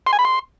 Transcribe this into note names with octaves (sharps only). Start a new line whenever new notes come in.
C6
G#5
B5
C6